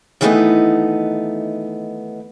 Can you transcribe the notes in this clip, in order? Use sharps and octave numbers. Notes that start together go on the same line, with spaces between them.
D#3 E3 G3 A3 B3 D#4